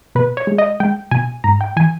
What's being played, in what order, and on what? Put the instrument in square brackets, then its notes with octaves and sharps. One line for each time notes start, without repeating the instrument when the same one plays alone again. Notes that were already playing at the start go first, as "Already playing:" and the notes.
[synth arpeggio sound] B2 B4
C#5
G#3
D#5
G#3 G5
B2 G#5
G#2 A#5
G5
E3 G#5